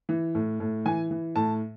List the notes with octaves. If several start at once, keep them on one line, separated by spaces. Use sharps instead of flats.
E3
A2
A2
E3 G#5
E3
A2 A5